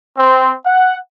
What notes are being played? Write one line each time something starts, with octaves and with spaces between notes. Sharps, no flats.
C4
F#5